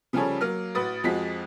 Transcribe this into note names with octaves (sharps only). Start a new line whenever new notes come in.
C#3 F3 G3 G#4 A4 C#5
F#3 A#3 F6
A1 F#4 B4 D#6 A6
F2 F3 G#3 F#4 B6